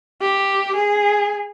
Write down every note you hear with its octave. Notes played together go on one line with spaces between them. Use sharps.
G4
G#4